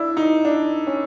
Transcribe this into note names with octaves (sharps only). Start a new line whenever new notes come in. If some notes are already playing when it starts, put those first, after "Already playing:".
Already playing: D4 E4
D#4
D4
C#4